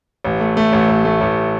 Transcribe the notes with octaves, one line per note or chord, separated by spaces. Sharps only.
A1
A3
A3
A1
A1
A3
A1